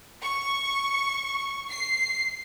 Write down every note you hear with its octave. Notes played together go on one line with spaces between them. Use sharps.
C#6
C7